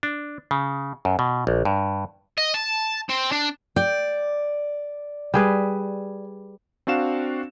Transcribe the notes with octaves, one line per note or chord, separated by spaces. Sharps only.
D4
C#3
F#2
B2
A#1
G2
D#5
A5
C4
D4
D5 G5
G3 G#4 B4
C4 D4 F#4 F5 E7